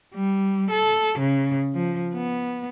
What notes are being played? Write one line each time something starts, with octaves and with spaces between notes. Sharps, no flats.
G3
A4
C#3
F3
B3